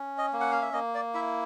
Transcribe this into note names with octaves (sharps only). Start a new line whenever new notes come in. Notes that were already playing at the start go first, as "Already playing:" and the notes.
Already playing: C#4
D#5
A#3
F#5
F5
E5
A#3 D#5
D5
E4 E5